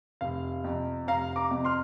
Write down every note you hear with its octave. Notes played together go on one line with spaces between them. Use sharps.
F1 F5
F2 C3
F1 F5 A#5
A#5 D6
F2 C3
C6 F6